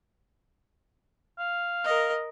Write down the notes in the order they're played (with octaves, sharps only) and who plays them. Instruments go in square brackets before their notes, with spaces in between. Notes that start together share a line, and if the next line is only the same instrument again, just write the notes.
[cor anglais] F5
[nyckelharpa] A#4 D#5